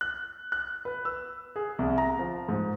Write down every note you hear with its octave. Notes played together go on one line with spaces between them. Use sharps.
F#6
F#6
B4
E6
G#4
C2
A#5
F3
G#2